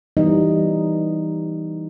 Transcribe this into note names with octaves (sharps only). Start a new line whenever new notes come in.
E3 G3 B3 D#4 D#5